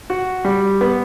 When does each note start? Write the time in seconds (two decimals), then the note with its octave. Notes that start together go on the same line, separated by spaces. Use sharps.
0.10 F#4
0.45 G3
0.81 B3